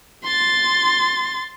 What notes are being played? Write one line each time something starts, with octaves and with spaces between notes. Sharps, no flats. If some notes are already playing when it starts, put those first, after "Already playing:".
C6 A6